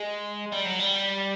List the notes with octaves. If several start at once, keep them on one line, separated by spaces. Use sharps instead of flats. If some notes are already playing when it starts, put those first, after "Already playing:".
Already playing: G#3
G3
F#3
G3